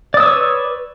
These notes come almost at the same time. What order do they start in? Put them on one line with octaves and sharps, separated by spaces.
D5 D#6 E6 C#5 B4